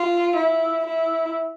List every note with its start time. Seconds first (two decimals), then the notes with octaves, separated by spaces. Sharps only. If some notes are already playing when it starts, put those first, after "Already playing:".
Already playing: F4
0.36 E4
0.85 E4